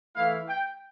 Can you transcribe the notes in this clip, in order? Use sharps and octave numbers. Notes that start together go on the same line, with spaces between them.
E3 A3 E4 F5
G5